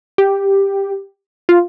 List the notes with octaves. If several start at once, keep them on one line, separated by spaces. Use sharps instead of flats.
G4
F4